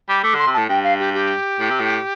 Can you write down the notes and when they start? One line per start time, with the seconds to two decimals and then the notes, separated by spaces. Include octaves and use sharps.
0.09 G3 D6
0.23 A3 D6
0.35 D3
0.39 C6
0.47 C3
0.54 A2 A5
0.69 G2 G5
0.84 F5
0.99 G4
1.14 G4
1.60 A2
1.71 C3
1.80 A2